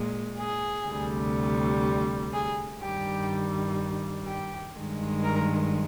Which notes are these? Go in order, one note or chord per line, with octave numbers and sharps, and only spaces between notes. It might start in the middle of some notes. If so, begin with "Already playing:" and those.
Already playing: A#2 G#3
G#4
D2 C3 G3
G#4
G2 D#3 G3 G4
G4
G2 D#3 G#3
A#4